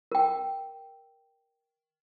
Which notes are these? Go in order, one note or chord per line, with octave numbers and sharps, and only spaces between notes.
A#4 G5